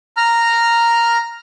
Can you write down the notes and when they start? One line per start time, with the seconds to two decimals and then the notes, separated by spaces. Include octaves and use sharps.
0.17 A#5 F6